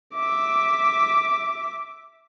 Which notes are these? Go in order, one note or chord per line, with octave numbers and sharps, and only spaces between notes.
E5 D6